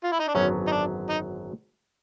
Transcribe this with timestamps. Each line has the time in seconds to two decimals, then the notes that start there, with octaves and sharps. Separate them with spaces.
0.03 F4
0.12 E4
0.19 D#4
0.28 D4
0.34 G#1 F#2 D3 F#3 B3 C#4
0.67 D#4
0.71 D4
1.09 D#4